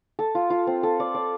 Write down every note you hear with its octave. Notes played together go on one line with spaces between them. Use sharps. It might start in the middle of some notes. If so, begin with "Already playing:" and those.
A4
F4
F4
C4
A4
D5
D5